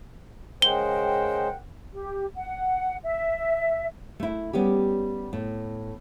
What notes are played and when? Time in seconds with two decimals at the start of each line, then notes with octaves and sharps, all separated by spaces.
0.62 C#3 G#3 A#4 C5 F#5 G5 G7
1.91 G4
2.37 F#5
3.03 E5
4.20 A3 E4
4.53 G3 B3 C#4 G4
5.33 A2